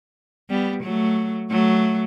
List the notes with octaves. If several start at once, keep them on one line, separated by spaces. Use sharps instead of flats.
G3 B3
F#3 A3
F#3 A3